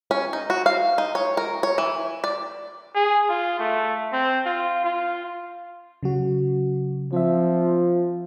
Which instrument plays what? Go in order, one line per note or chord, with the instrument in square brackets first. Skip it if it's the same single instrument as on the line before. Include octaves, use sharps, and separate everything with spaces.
[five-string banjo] C#4
D#4
F#4
F5
D#4
C#5
A#4
C#5
E3
D5
[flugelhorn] G#4
F4
A3
C4
F4
F4
[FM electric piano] C#3 F#3 F#4
[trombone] F3 [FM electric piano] C4 E5